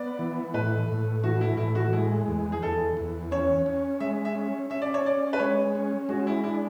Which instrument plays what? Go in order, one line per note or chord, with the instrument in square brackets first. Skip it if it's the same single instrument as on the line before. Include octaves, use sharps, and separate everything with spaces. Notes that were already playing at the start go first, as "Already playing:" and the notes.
Already playing: [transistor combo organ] B3 [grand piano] D5
[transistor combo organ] E3
[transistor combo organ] A2 [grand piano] B4
[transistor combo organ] A2
[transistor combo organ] E3 [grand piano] F#4
[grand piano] E4
[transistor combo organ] A2 [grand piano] E4
[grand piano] F#4
[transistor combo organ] G#3 [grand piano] E4
[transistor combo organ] E2
[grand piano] G#4
[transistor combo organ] E2 [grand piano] A4
[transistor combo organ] E2
[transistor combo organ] C#4 [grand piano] C#5
[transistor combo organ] C#4
[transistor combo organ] G#3 [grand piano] E5
[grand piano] E5
[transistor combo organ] C#4
[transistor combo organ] C#4 [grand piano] E5
[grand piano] D5
C#5
[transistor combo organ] C#4 [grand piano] D5
[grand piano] B4
[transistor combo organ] G#3 [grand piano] C#5
[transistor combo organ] C#4
[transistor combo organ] G#3 [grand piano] F#4
[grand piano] E4
[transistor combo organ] D4 [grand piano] E4